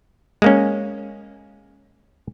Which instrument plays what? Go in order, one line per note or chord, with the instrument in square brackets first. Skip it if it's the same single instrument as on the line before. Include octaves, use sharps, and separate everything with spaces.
[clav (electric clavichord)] G#3 A#3 C#4